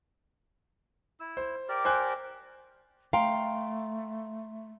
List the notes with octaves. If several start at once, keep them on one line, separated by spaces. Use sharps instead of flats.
E4 E6
C5
G4 A#4 D5
C5 G#5 F#6
A3 F5 G5 A#5 C6